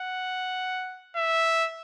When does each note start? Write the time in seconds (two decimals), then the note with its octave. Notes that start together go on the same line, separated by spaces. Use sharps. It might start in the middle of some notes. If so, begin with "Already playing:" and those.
Already playing: F#5
1.16 E5